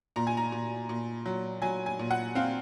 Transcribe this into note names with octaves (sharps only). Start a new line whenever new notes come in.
A#2 A#5
G#5
A#5
A#2
A#2
F#3
F#3 G#5
G#5
A#2
F#5
C4 F5